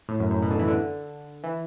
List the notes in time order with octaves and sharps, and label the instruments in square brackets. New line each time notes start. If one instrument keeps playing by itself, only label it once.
[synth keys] A2
F#2
F#2
B2
D3
E3
D3
E3